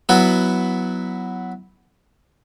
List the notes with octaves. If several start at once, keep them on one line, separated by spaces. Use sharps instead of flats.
F#3 B3 E4 F#4